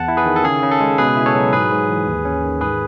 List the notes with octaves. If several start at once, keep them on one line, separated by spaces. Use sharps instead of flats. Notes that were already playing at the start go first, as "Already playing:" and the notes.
Already playing: E2 F#5 A5
E4
G#4 B4
D#3
A4
C#3 G#4
C#3
A4
G#3
B2 G#4 B4
E4
A4 C#5
F#3
G#2 G#4 B4
G#2
E3
D#2
C#4
D#3
G#2 G#4 B4